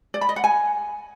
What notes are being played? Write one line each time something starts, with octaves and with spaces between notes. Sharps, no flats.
D5
B5
D#5
F#5
G#5